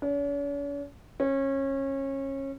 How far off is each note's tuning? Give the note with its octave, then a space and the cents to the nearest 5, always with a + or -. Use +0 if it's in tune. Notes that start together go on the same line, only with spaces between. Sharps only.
C#4 +45
C#4 -25